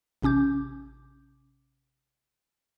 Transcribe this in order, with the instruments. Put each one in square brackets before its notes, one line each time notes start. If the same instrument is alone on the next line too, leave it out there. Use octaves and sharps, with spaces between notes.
[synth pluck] A1 C3 C#4 D6 G6